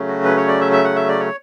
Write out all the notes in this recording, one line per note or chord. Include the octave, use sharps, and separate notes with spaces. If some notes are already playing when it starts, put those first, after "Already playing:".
Already playing: C#3 F#3 A3 C#4
F#4
B4
C#5
D5
E5
E5
F#5
E5
D5
C#5